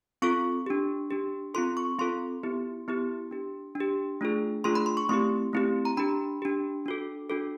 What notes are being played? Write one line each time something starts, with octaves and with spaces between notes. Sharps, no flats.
C4 F4 A4 C#6
D4 G4
D4 G4
C4 F4 A4 C6
C#6
C4 F4 A4 C6
B3 E4 G4
B3 E4 G4
D4 G4
D4
G4
A3 D4 F4 G#4
A3 D4 F4 G#4 C6
B5
C6
C#6
A3 C4 E4 G4 C6
A3 C4 E4 G4
A#5
D4 G4 B5
D4 G4
D4 F#4 A4
D4 F#4 A4